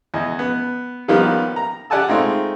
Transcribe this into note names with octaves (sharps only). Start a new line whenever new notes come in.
E2 D#5
B3
D#3 F3 G3 A#3 B3 D#4
A#5
G4 D5 F#5 G#5 A5 E6
G#3 A3 C4 D#4 F4